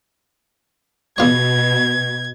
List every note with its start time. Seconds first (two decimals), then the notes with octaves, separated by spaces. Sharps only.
1.18 E2 B2 F4 C#5 G#6